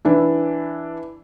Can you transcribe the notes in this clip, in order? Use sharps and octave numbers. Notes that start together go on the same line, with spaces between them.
E3 D4 E4